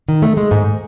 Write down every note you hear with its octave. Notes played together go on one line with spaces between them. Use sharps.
D#3
A3
G#3
G#2